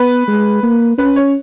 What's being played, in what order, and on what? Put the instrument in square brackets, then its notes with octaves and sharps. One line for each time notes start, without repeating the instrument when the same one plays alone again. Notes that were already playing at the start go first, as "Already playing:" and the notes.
Already playing: [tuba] B3 [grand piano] B4
[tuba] G#3
A#3
[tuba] C#4 [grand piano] B4
[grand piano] C#5